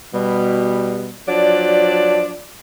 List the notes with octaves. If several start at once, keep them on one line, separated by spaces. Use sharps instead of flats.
B2 G3
F3 F#3 D4 D5